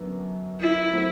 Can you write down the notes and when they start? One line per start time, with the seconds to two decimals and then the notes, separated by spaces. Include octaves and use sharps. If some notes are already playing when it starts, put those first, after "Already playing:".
Already playing: F#2 D3 F#3 B3 D4
0.60 E4
0.93 F#3 A3 C4